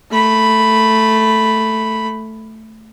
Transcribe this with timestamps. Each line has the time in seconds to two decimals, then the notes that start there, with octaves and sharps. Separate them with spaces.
0.11 A3 B5